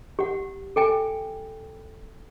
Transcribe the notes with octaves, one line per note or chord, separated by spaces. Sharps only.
G4 F#5
A4 G5 G#5